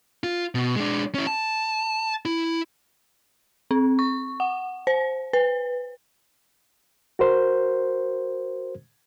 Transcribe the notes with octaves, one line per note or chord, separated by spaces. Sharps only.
F4
B2
G#3 D4
C#4 E4
A5
E4
C4
C#6
F#5
C5
B4
F#4 A#4 C5